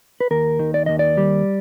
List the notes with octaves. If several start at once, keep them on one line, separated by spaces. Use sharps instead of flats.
B4
D#2 A#4
D#3
D5
D#2 D#5
D5
G3